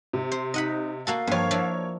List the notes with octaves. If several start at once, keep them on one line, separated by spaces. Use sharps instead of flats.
C3
C5
D#4 D#5 F#5 B5
A#3 F#4 A4 F5
G2 F3 A#3 C#5
F3 D4 E4